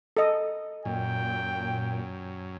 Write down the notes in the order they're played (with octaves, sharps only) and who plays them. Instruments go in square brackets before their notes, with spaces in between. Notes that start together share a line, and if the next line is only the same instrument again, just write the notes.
[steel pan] A4 D#5
[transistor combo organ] F#2 [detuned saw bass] A#2 [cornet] G5